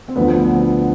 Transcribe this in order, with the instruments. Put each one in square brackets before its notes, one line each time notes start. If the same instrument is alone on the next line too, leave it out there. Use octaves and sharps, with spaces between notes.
[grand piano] C4
D2 D3 F3 B3